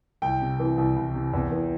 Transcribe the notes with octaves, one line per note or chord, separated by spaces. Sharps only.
C2 G5
C3
E3
C2
C2
C3
E2
E3